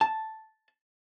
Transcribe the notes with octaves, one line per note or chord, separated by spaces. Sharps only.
A5